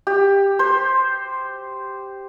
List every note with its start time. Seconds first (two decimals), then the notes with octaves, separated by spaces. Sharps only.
0.07 G4
0.59 C5